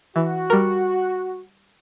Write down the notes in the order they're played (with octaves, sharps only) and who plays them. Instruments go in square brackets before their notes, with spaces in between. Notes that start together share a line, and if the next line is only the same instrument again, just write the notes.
[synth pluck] E3 [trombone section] F#4
[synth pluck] G3 A#4